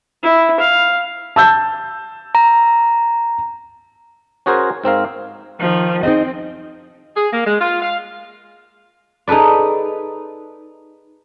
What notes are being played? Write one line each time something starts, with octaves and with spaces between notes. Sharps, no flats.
E4
F5
A5 E6 G6
A#5
C#4 F#4 G#4 A#4 C5
G#2 C4 A#4 F5
D#3 F3
C4 D#4 G#4 D#5
G#4
A#3
G#3
F4
F5
D#4 G#4 A4 B4 D5